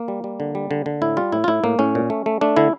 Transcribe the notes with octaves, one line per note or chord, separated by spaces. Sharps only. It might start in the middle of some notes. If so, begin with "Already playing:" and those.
Already playing: A#3
G3
G3
D3
G3
D3
D3
A2 E4
G3 F4
A2 E4
F4
A2 E4
A2 A#3
A2 C#4
A#2
A3
A3
A3 D4
D3 E4